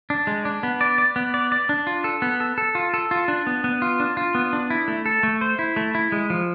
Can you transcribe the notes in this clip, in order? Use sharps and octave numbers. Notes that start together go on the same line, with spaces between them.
D4
G#3
D4
B3
D5
D5
B3
D5
D5
D4
F4
A4
B3
A4
A4
F4
A4
F4
D4
B3
B3
F4
D4
F4
B3
D4
E4
A3
A4
A3
C5
E4
A3
E4
G#3
F3